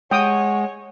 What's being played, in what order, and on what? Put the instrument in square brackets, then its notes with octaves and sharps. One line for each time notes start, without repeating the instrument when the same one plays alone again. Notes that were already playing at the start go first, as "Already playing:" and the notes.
[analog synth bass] G#3 [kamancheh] C#5 [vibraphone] F#5 [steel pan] G5 D#6